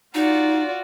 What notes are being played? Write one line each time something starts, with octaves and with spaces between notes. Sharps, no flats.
D#4 F4 F#4 D5